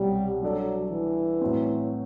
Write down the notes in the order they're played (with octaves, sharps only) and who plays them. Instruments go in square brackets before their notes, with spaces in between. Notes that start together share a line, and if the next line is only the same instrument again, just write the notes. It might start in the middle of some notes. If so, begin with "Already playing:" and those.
Already playing: [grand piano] C2 B2 F#3 B3 [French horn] G3
[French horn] F#3 [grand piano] G3 D4 A4 D5
[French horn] E3
[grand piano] A2 F#3 C4